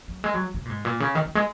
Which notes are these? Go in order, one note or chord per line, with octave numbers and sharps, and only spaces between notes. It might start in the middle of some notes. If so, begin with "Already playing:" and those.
F#3
G#3
F#3
C#3
A#2
G#2
A#2
C#3
D#3
D#3
G#3